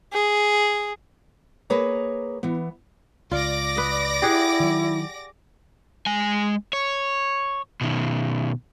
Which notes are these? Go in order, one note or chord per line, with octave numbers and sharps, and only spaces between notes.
G#4
A#3 G#4 B4 C#5 A#5
E3 B3
C#2 F4 D5 D6 A#6
B4 D#5
E4 G4 G#4 F#5
D#3 F#3
G#3 G#5
C#5
B2 D#3